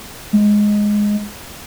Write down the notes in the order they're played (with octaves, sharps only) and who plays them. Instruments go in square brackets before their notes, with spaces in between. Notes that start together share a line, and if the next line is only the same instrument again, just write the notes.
[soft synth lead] G#3